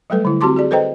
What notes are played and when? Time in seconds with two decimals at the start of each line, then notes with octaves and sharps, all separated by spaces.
0.10 F#3 G3 A3 A4 B4
0.25 D3 E4
0.41 C4 F#4 G4 A5 C6 D6
0.56 F#4 G#4 D5
0.71 A4 B4 C5 D#5 G5 A#5